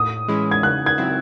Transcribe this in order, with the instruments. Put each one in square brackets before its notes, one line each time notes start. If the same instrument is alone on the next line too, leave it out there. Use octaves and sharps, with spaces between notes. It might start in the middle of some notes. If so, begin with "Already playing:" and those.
Already playing: [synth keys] A2 [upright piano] D#6
[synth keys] E3 G#3 C#4 E4
[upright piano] G#6
[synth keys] C#3 [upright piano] F#6
[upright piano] G#6
[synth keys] F#3 C4 E4